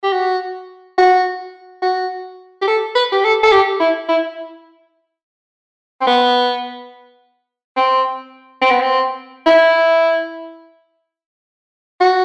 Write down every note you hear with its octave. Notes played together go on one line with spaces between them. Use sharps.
G4
F#4
F#4
F#4
G4
A4
B4
G4
A4
A4
G4
E4
E4
C4
B3
C4
C4
B3
C4
E4
F#4